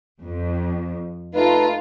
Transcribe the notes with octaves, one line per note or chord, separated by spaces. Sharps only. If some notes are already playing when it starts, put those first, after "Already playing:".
F2
A3 D#4 F4 B4